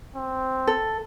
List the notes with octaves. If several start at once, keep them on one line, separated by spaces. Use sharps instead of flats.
C4
A4